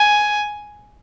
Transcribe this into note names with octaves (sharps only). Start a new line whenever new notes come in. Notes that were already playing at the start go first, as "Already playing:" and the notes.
Already playing: G#5